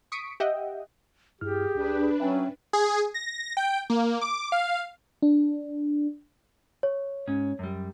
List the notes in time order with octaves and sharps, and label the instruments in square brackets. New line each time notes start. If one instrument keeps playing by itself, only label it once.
[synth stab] C#6 D#6 B6 C#7 D7
G4 D#5 E5 F#5 G5
[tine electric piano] G2 E4 F6 [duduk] G4 [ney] G#4
[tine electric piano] C#2 [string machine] D4 B4
[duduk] F#3 [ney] C#4 [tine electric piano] E5 G5 G#5
[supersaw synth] G#4
A#6
G5
A#3
D6
F5
[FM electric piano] D4
[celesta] C#5
[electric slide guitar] G#2 C#4
F#2 G3